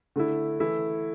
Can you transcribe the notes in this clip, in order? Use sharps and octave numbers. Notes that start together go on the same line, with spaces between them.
D3 A3 E4
E3 A3 E4